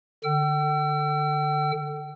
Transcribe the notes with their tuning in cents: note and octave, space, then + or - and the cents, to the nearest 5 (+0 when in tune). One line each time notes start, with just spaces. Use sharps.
D3 +10 G5 -40 E6 +35